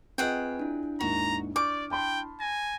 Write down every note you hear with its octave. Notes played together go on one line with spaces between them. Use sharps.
C4 F4 G#4 B4 D#5 F#5 G5
D4 E4
D#2 G#2 F#4 A#5
D5 C#6 D6 F6 G6
G5 A5 B5 C6
G#5 A#6